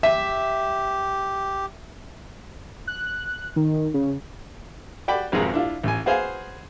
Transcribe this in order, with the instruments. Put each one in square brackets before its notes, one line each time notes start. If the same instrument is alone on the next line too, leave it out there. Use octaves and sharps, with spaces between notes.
[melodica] G4 [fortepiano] E5
[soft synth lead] F#6
D#3
C#3
[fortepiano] F#4 D5 G5 B5
G#1 F2 B2 G#3 G#4 A#4
D4 E4 F4
A1 G#5
F#4 G#4 B4 C5 F5 G#5